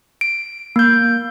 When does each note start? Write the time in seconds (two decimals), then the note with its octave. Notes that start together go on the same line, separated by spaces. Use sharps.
0.21 D7
0.76 A#3 G6